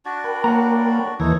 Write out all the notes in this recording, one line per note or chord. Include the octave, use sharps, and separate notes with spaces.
D4 F#4 D5 G#6
A#4 G5 B5
A#3 C#5 F#5 A#5
D#2 E3 D#4 A4 C#5 G#6 A#6